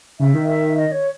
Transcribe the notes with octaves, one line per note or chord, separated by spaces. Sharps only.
C#3 E5
D#3
E5
D#5
C#5